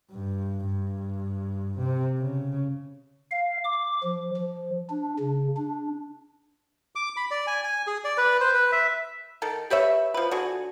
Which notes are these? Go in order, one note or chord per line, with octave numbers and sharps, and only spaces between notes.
G2
G2
C3
C#3
F5
D6
F3
F3
D4
C#3
D4
D6
B5
D5
G#5
G#5
G#4
D5
B4
C5
B4
E5
D#3 A4 A#4
G4 B4 C#5 E5
F3 B4
D3 F#4 G#4